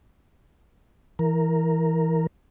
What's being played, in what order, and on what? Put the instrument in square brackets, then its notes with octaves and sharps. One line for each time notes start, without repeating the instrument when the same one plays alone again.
[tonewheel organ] E3 A#4